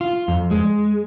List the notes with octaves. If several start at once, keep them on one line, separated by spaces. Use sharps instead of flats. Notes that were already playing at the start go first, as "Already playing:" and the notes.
F4
F2
G#3